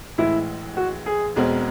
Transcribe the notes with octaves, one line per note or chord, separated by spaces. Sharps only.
A1 A2 E3 G#3 E4
F#4
G#4
E1 E2 B2 G#3 C4